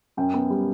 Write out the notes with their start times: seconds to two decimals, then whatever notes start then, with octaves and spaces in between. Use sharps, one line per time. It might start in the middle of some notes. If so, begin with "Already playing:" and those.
0.17 F#2 G5
0.34 B3
0.50 G3